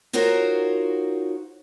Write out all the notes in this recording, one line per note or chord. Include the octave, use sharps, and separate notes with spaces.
D#4 F4 F#4 A#4 C5 C#5